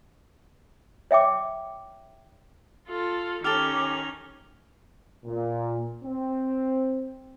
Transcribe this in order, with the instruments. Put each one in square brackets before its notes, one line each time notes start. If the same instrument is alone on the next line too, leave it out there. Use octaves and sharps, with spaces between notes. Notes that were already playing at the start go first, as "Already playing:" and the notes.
[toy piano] C#5 E5 G5 D6
[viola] F4 A4
[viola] D#3 C#4 [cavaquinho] G4 A4 [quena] D6 [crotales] F6 F7 G7
[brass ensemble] A#2
C4